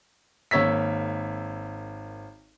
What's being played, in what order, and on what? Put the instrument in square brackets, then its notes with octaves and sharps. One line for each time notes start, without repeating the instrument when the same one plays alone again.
[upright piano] G#1 A#3 C#5 E6 B6